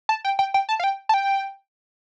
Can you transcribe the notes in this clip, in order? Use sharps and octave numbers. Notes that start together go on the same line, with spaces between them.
A5
G5
G5
G5
A5
F5
G5
A5
G5